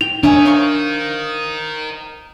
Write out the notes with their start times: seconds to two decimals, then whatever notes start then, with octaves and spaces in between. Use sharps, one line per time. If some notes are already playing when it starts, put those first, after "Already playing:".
0.01 G5 F7
0.23 D4 A#4 C#5 D#5 E5 G#5
0.46 C5 F5 C#6